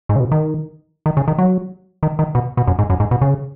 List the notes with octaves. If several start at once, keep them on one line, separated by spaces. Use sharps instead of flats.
G#2
C#3
B2
D#3
D#3
C#3
D#3
F#3
D#3
D#3
B2
B2
F#2
G#2
F#2
G#2
B2
C#3